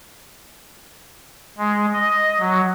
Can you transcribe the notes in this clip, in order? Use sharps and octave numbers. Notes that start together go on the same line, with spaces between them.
G#3
D#5
F#3